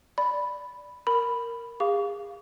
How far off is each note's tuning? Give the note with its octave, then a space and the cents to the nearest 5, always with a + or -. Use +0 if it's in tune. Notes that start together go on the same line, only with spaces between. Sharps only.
D5 +0 B5 +0
A#4 -5 B5 +0
G#4 -35 F5 +0 C#6 +45